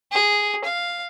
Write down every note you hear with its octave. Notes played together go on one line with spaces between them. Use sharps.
G#4
F5